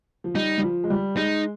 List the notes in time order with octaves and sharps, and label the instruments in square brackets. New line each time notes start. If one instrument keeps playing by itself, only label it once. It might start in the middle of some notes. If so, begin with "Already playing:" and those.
[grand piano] F3
[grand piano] G3 [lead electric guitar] D#4
[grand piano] G3
F3
G#3
G3
[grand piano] G#3 [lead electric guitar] D#4